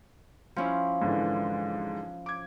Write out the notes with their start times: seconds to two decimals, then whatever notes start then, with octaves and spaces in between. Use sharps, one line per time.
0.56 F3 C#4 E4
1.02 G#2 D3 E3
2.26 D6 G#6